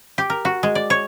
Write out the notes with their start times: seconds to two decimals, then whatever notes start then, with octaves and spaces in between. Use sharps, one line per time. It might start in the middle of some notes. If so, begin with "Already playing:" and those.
0.18 G4
0.30 A#4
0.45 F#4
0.63 G#3
0.75 D5
0.90 C#5